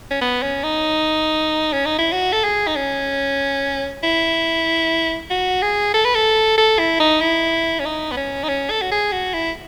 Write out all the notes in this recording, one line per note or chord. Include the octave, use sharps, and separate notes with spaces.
C#4
B3
C#4
D#4
C#4
D#4
E4
F#4
A4
G#4
D#4
C#4
E4
F#4
G#4
A4
B4
A4
A4
E4
D#4
E4
C#4
D#4
B3
C#4
D#4
C#4
A4
F#4
G#4
F#4
E4